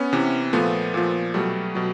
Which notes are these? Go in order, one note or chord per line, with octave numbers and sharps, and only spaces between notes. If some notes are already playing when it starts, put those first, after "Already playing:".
Already playing: B3 C#4
C3 E3
A#2 F3 A3 B3
A#2 F3
B2 F#3 G3 A3
B2 F#3